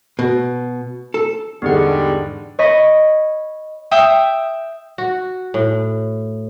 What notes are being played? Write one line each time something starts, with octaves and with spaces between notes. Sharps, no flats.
B2
A4
E2 G#2 D3 G3 B3 G#4 F#5
C#5 D#5 B5
E5 G5 D#6
F#4
A2